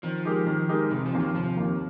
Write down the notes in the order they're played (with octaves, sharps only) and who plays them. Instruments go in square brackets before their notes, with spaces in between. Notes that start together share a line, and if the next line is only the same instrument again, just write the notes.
[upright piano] D#3 [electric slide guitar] F3
[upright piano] G#3 D#4 G4 A#4
D#3
G#3 D#4 G4 A#4
[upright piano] F1 [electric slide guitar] D#3
[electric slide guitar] F3
[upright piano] D#2 D#3 A#3
[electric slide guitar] F3
[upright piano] F1 [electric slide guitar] F3
[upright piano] D#2 D#3 A#3